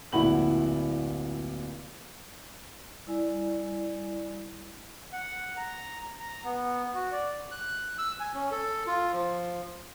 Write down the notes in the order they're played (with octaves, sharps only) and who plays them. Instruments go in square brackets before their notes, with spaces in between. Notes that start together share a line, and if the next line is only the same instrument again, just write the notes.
[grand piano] D1 A#1 E4 F#5 B5 F#7
[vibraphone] G3 E4 D5 G#5
[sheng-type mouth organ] F#5
A#5
A#5
B3
F#4
D5
[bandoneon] F#6
E6
G#5
C#4
A4
F4
F3